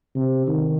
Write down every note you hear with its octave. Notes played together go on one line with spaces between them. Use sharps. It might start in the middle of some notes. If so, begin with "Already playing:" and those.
C3
D#3